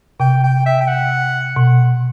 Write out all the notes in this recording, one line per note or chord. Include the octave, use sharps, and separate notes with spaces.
C3 G5
G5
E5
G5
F#5
B2